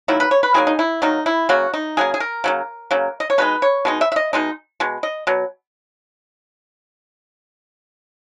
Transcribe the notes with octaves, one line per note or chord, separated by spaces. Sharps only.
D#3 F#3 A#3 E4
B4
C#5
B4
D#3 F#3 A#3 G#4
D#4
E4
D#3 F#3 A#3 D#4
E4
C#3 F#3 A#3 F#4
D#4
C#3 F#3 A#3 G#4
G#4
A#4
C#3 F#3 A#3
C#3 F#3 A#3
D#5
C#5
B2 G#3 D#4 B4
C#5
B2 G#3 D#4
E5
E5
D#5
B2 G#3 D#4
B2 G#3
D#5
B2 F#3